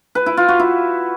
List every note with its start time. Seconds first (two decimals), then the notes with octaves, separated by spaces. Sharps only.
0.15 B4
0.26 E4
0.37 F4
0.48 F#4
0.59 E4